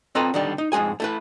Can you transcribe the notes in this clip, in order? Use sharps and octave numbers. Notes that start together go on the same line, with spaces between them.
C4 F4 A4 B4 D#5 A#5
D3 D#3 G3
D#4
F2 G#2 G#3 G#4 G#5
A3 E4 B4